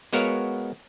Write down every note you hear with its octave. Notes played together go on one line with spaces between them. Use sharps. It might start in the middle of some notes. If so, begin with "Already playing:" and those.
G#3 B3 F#4 A#4 C#5 F5